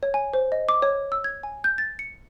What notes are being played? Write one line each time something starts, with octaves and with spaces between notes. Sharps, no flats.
C#5
G#5
C5
D#5
D6
C#5
E6
G#6
G#5
G6
A6
C#7